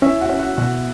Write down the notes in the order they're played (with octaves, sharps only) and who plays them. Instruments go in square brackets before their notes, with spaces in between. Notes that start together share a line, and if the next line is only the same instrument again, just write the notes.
[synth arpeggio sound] C#4 [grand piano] E4 E5
[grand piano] F#4 F#5
[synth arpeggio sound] C#4
[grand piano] F#4 F#5
[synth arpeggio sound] B2 [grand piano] F#4 F#5